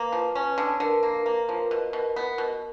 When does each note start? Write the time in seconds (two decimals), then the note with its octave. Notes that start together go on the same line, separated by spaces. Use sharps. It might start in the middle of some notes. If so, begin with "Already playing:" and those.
Already playing: A#3 B4
0.12 F3
0.35 C#4
0.58 D3
0.80 D3 A#4
1.03 A#3
1.26 A#3
1.49 F3
1.71 B2
1.93 B2
2.16 B3
2.38 B2